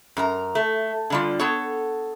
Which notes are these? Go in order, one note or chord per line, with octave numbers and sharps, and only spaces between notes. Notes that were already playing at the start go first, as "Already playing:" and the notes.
F#2 A#4 A#5
A3
D3 G3 F4
B3 A4 C#5